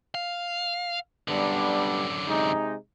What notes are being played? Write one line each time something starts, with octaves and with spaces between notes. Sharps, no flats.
F5
F#2 D3 G3 B3 D4
C3 G#3 D#4